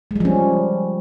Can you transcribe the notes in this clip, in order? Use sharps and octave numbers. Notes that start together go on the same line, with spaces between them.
F3 G3 G#3 C#4